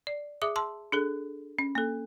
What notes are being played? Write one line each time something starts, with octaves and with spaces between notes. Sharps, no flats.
D5
G#4 E5 D6 D#6
A5 C6 E6
D4 G#4 A4
C#4
A#3 A4